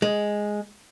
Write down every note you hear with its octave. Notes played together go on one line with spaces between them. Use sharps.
G#3